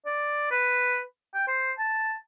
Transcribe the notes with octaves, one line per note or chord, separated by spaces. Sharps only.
D5
B4
G5
C5
A5